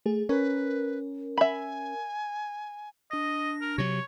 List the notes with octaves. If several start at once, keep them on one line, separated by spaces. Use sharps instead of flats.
A3 G#4
C#4 A#4 B4
E5 G#5 B5
D4 D#5 A#6
A#4
C3 F#3 C#5